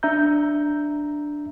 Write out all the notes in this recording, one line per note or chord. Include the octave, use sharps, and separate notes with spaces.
D4 E5 A#5 G6